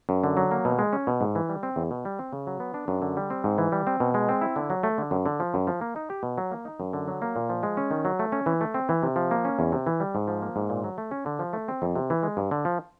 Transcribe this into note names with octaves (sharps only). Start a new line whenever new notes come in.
F#2
D3
F#3
A#3
B2
G#3
C#4
B2
G#2
E3
G3
C4
E2
B2
G3
C4
C#3
F#3
B3
D4
F#2
D3
G3
C4
G#2
E3
G3
C4
B2
G#3
C4
E4
D3
F#3
A3
D3
F#2
D3
F3
F#2
F3
A#3
D#4
G4
B2
F#3
A#3
D#4
F#2
D3
F#3
A#3
A#2
F3
G#3
C#4
D#3
F#3
A3
C#4
E3
A3
C4
E3
C3
F3
A#3
C#4
E2
C3
E3
G3
G#2
F3
A#3
G#2
A#2
F#3
A3
C#4
D3
F3
A3
C4
F2
C3
E3
G#3
G2
D3
F3